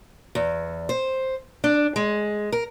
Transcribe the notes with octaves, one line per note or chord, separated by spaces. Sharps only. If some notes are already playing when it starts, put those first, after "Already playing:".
E2
C5
D4
G#3
A#4